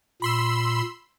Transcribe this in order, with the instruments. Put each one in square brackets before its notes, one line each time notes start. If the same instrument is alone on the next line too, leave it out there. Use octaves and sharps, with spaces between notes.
[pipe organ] A#2 [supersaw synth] B5 C6 E6